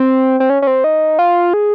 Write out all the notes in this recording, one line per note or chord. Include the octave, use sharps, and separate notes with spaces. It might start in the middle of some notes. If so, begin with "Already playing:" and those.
Already playing: C4
C4
C#4
C#4
C4
D#4
F4
G#4